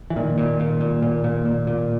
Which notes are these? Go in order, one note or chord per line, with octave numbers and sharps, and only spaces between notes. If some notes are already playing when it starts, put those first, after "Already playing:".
E3
A#2 D#3
A#2
A#2
A#2
A#2
A#2
A#2
A#2